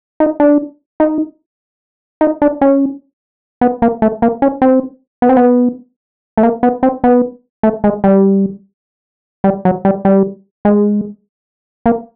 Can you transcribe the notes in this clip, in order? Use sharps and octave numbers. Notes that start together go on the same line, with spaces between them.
D#4
D4
D#4
D#4
D4
C#4
B3
A#3
A3
A#3
C#4
C4
B3
C4
B3
A3
A#3
B3
C4
B3
A3
G#3
G3
G3
F#3
G3
G3
G#3
A#3